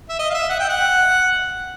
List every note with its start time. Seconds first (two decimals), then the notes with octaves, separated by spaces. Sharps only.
0.09 E5
0.19 D#5
0.30 F5
0.34 E5
0.50 F#5
0.60 G5
0.69 F#5